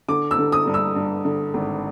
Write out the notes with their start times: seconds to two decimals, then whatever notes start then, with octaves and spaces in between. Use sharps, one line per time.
0.09 D3 D6
0.31 E6
0.38 D3
0.52 D#6
0.67 G2
0.74 E6
0.96 G2
1.25 D3
1.54 G#1